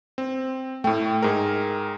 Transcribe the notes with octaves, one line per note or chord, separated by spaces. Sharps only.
C4
A2 A3 G5
G#2 G#4 A#4